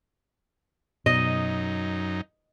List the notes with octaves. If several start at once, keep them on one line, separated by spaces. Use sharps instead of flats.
F#2 B2 D#4 D#5